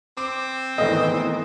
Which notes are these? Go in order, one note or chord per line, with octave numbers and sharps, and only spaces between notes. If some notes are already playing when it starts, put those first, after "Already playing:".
C4 D6
G#2 D#3 E3 A3 B3 D#5